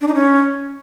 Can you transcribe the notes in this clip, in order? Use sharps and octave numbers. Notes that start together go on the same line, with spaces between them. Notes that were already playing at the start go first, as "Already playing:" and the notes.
D4
D#4
C#4